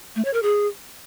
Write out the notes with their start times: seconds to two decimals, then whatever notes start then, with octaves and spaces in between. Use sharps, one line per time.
0.16 A3
0.25 C#5
0.34 A#4
0.43 G#4